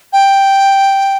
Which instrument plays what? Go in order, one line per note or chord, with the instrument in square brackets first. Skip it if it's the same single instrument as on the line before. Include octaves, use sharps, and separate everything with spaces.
[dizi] G5